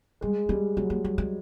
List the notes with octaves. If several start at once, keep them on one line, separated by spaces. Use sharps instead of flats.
G3 G#3
G3 G#3
F#3 B3
A#3
G#3
G#3